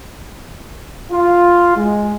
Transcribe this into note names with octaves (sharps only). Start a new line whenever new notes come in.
F4
G#3